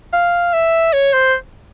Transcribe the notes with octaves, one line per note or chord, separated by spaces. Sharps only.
F5
E5
C#5
C5